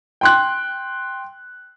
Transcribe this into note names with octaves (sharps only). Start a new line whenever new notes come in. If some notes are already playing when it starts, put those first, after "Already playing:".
G5 C6 F#6